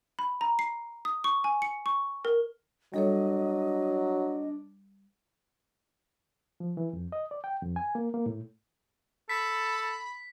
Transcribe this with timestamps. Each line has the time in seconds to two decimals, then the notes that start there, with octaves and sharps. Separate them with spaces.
0.19 B5
0.41 A#5
0.59 C7
1.05 D#6
1.24 C#6
1.44 G#5
1.62 C#7
1.86 C#6
2.25 A#4
2.94 F#3 G3 D4 A4 C#5 D#5
6.60 F3
6.77 E3
6.93 F2
7.12 D#5
7.31 D5
7.44 G5
7.63 F2
7.76 G#5
7.95 A#3
8.14 A#3
8.26 A2
9.29 A4 B5 B6